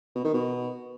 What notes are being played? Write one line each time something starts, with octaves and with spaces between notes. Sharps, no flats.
B2
D#3
B2